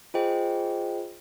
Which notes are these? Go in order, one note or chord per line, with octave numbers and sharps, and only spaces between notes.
F4 G#4 C5 D#5 G5